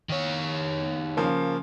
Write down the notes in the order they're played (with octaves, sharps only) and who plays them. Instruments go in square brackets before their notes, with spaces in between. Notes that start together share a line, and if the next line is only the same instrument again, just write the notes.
[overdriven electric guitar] D#3 C#5
[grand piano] C#3 F3 A#3